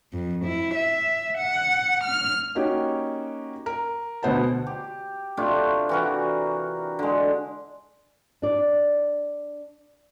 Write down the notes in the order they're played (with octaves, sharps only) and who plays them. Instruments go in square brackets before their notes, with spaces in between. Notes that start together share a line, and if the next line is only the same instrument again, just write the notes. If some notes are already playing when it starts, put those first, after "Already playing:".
[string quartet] F2
E4
E5
F#5
F6
[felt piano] A#3 C#4 D#4 F#4 G4
A#4
D2 B2 B3 C5 F#5 A5
[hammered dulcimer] G4
C3 A3 D4 F4
E3 F#4 A#4
D3 G#3
[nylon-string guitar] D4 D5